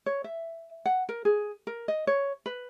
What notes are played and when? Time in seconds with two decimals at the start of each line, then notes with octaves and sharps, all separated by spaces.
0.06 C#5
0.24 E5
0.86 F#5
1.09 A#4
1.25 G#4
1.67 A#4
1.88 D#5
2.07 C#5
2.46 B4